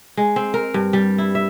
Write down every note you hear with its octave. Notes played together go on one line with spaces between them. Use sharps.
G#3
C4
A#4
G2
G3
E4
E5